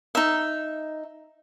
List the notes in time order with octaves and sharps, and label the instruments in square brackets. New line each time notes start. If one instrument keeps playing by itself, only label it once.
[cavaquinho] D#4 E5